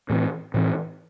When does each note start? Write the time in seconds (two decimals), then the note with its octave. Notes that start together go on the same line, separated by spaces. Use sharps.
0.10 A2 E3 C4
0.54 A2 E3 C4